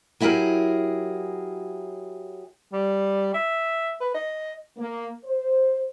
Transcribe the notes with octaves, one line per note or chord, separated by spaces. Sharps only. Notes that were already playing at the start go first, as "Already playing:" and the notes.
F#3 E4 G4 G#4 A#4
G3
E5
B4
D#5
A#3
C5